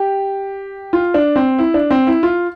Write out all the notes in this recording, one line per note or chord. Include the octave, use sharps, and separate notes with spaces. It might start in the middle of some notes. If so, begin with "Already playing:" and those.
Already playing: G4
F4
D4
C4
E4
D4
C4
E4
F4